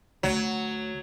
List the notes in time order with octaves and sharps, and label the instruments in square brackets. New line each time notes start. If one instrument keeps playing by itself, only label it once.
[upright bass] D2 [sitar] F#3